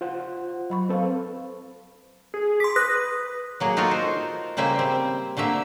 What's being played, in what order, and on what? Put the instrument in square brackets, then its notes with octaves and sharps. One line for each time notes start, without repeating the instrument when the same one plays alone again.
[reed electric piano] F4 C5 F#5
[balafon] F#3 B5 C#6
[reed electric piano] C4 A4 [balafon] B4 C5 F5
[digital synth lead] G#4
[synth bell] C6 B6 [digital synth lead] D6
[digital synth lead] B4 [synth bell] D#6 F#6 A#6
[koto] F#3 A#3 G#4
D#4 F4 F#4 A4 A#4
C5
C#3 G3 A#3 C5 E5 G#5
C4
D3 A3 A#3 E5